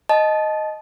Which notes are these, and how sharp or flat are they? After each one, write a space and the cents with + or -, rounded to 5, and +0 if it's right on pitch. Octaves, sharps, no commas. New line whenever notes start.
D#5 +0 A5 -25